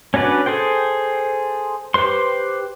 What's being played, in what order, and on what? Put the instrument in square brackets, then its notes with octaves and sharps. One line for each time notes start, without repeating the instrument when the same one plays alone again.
[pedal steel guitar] C#4 D4 F#4 B4 D5
G#4 A4 C5 G5
G4 B4 C5 C6